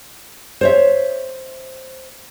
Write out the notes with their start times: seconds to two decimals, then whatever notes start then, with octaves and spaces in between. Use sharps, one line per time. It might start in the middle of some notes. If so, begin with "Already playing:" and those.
0.61 C5 C#5 E5